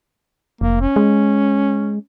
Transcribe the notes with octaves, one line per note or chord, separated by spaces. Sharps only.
F1 A#3
C#4
G#3